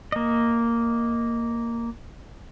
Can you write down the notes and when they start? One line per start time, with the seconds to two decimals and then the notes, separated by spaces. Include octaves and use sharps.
0.12 A#3 D#5